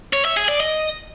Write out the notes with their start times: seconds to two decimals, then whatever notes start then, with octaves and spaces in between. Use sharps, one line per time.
0.13 C#5
0.25 E5
0.37 G#4
0.48 D5
0.60 D#5